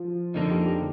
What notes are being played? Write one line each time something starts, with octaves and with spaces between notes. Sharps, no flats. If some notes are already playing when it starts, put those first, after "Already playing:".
Already playing: F3
F2 D3 F3 A#3 D4 D#4
G4
G4